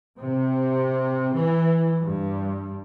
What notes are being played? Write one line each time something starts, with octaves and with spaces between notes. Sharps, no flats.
C3
E3
G2